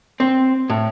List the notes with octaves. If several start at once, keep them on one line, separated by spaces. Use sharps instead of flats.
C4
A2